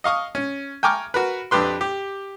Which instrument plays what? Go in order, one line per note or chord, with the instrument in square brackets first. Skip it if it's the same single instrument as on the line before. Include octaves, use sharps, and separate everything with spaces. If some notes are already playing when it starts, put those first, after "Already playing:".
[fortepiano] D#5 F5 C#6 D#6
C#4
G5 G#5 A#5 C#6 D6 F6
F#4 A#4 B4
F2 D4 G4 B4 C6
G4